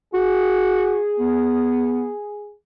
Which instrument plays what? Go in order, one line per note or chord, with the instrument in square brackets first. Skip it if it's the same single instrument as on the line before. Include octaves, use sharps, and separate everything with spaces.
[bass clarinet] F#4 [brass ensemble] G#4
[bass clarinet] B3